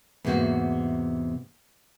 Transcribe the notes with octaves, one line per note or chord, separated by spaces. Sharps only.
E2 G#2 C3 A#3 F#4